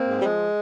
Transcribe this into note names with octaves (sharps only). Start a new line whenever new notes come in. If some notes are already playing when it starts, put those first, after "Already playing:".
Already playing: A#3 C4
G#2
G3
F3 G#3